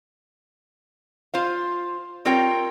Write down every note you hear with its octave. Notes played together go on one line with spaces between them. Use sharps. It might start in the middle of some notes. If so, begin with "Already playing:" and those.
F4 C5 F5
G3 C4 F4 A#4 C#5 G5